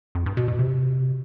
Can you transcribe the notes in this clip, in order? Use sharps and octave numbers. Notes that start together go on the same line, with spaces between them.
F2
G2
B2
B2
C3